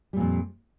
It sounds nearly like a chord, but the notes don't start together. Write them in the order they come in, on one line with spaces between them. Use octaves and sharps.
G3 A#2 F2